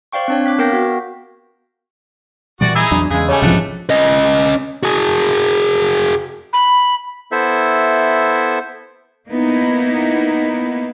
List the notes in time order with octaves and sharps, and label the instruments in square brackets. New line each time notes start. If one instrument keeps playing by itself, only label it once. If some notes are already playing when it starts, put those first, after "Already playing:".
[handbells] C5 D5 F5 G5 C#6
C4 D4 C#5
D6 F#6 B6
B3 A#4 F5 G5 G6 A#6
F#4
[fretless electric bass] A#2 E3 G3 [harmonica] F#4 D5
[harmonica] D#4 E4 G#4 [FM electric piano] E6 G#6
[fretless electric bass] E2 F#3 D4
[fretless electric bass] E2 [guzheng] C#3 G#3 [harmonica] G#4
[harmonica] G3 A3 [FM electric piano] C#5 G#5
[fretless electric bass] B1 C3 E3 [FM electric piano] G#2 F3 [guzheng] D4 F#5
[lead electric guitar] C#4 D#5
F#4 G#4
[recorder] B5
[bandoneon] B3 E4 A4 C5 E5
[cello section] A#3 B3 D#4 E4